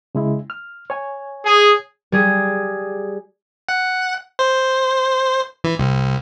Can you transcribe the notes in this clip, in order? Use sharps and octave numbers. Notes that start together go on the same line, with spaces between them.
C#3 G#3 E4
F6
C#5 G#5
G#4
G3 G#4
F#5
C5
E3
C2